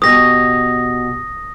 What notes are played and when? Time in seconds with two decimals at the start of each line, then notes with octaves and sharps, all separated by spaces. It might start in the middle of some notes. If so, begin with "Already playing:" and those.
0.02 B2 G4 C#5 D#6 A#6